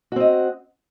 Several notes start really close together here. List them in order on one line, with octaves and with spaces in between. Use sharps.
F#4 C4 D#5